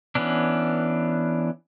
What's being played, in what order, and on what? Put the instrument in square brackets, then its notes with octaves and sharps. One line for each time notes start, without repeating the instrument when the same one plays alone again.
[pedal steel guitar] E3 B3 C#4 D4